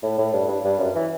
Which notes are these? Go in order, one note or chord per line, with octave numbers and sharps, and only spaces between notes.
A2
A2
G2
G2
G2
F#2
E3